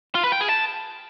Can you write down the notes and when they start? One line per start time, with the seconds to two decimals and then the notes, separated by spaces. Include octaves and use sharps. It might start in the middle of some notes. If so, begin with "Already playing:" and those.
0.15 F4
0.24 B4
0.32 G5
0.41 G#4
0.49 A5